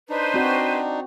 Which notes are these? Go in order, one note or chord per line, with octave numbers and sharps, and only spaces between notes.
D4 D#4 B4 C5
C4 F#4 D5